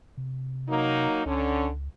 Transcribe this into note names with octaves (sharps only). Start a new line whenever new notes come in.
C3
F#3 A#3 D#4
C#2 D3 C#4